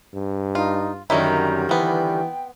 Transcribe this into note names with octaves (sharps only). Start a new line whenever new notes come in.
G2
D#4 F4
F#2 D3 D#3 G3 C#4 D#4 E4 A#5
E3 B3 C4 G5